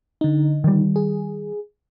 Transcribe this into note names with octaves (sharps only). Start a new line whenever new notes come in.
D3 D#4
D#3 G3
G#4